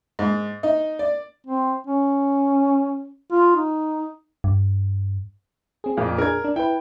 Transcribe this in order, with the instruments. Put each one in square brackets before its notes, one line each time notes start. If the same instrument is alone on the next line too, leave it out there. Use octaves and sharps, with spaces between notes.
[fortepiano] G#2
D#4
D5
[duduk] C4
C#4
F4
D#4
[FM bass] G2
[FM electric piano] C4 G#4
[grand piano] F2 A#2 A#3
[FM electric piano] D4 G#4 [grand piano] A#4 G#6
[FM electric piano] D4
[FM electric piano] E4 B4 [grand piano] G5